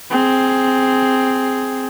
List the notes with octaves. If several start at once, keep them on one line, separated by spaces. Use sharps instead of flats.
C4 G#4